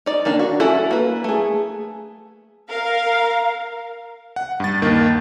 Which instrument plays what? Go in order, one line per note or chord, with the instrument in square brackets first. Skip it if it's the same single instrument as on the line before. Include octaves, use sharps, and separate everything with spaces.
[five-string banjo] D#4 D5
D#3 A#3 D4
F#4
C#4 E4 F#4 A4
A#3 B4
A3 G#4
[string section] A#4 F5
[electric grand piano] F#5
G2 A6
D#2 D#3 A#3